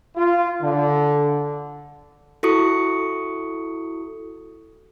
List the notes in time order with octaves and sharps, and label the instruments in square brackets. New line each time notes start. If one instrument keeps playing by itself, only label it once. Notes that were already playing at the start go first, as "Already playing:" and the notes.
[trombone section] F4
D3
[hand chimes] E4 F#4 A4 C#6 D#6 C#7